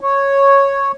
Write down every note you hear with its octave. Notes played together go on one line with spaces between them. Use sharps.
C#5